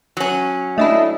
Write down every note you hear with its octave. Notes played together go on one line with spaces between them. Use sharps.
F#3 C#4
A3 D4 E4 D#5 E5